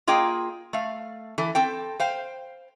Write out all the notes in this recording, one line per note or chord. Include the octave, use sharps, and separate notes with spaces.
A#3 F4 G#4 D#5 G5
A3 F5
E3 A4
C4 A4 G5
C5 F5 G5